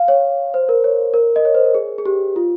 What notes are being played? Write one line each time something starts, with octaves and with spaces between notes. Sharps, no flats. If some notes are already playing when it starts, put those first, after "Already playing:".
Already playing: F5
C#5
C5
A#4
C#5
A#4
D#5
C#5
C5
A#4
G#4
G#4
G4
F4